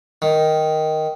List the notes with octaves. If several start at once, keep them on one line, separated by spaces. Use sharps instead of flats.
D#3